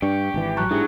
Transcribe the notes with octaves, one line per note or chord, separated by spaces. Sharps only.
G2 D4 G4 C#6
G#1 C#3 E3
A1 F#3 A5 A#5 C#6 F#6
G#2 F#3 D4 E4 G4 G#4